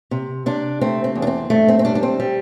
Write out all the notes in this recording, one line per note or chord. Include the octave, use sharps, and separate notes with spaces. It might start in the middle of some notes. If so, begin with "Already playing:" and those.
C3
C3 D4
A3 C4
C4
E2
D4
C4
G2 A3
C4
C4
G3 D4
D4
C4
G3